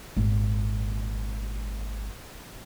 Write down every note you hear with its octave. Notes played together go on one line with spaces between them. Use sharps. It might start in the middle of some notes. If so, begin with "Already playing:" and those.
G#1 A#2